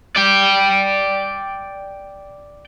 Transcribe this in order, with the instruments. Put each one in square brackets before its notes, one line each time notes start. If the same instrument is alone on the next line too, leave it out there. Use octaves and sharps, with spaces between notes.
[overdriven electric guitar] D5 G5